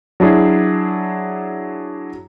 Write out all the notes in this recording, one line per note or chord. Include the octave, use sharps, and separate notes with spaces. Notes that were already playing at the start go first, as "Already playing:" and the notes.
F#3 D4 E4 G#4